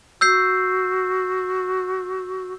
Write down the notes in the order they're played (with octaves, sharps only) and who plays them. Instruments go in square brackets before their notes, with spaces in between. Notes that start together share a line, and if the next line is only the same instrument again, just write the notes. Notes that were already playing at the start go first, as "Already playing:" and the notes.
[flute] F#4 [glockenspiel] E6 G6 C7